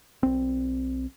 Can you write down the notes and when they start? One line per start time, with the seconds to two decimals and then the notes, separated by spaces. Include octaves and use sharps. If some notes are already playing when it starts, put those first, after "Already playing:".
0.23 B1 C4